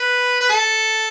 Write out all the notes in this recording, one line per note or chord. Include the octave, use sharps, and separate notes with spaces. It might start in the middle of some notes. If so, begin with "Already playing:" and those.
Already playing: B4
B4
A4